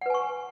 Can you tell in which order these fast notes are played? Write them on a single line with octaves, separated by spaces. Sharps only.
F#5 B4 G#5 C#6